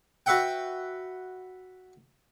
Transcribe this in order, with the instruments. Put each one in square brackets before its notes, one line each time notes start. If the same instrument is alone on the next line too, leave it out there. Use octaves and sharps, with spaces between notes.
[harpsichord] F#4 B4 E5 F#5 G5